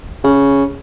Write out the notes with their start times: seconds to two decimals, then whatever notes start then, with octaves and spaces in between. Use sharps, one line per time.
0.24 C#3